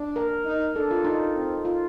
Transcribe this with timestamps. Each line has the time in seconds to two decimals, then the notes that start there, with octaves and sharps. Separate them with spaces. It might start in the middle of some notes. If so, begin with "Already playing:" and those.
Already playing: D4
0.16 A#4
0.45 D#4
0.76 D4 A4
0.91 F4
1.05 D#4
1.35 C4
1.65 F4